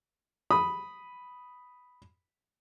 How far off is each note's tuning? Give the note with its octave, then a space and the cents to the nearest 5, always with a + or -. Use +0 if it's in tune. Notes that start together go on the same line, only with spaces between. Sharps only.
B5 +0 D#6 +0